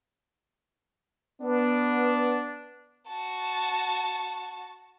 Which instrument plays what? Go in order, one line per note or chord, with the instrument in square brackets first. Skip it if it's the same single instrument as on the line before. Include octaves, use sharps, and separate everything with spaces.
[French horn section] B3 [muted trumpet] D4
[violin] F#4 A5